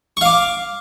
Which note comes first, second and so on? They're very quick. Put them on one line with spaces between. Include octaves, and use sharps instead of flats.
C#6 F5 D6